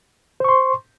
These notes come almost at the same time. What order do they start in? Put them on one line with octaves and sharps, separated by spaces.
C5 C#6 C6